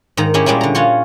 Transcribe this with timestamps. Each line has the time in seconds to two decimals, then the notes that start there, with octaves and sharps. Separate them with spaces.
0.17 G#2 D#3 A#5
0.34 G#3 C#4 E4 G4
0.46 A#2 G3 G#3 C#4 E4
0.61 D3 A#5
0.75 C#4 F4 F#4 C#5